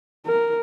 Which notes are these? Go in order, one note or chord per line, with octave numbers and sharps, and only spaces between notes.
A#4